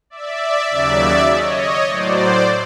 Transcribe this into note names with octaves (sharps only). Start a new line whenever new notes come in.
D5 E5
D#2 C#3 F#3 D5 E5
C#5 D#5
A2 F#3 C5 D5